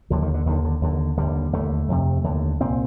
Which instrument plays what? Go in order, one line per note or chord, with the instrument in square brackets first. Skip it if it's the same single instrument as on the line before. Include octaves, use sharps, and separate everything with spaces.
[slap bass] D#2 D3 F3
D#3
D3
D#2 D3 D#3
D3
D#2 D3
D#2 D3 G3
D#2 D3 A3
F2 C3
D#2 D3
C2 A#2 C4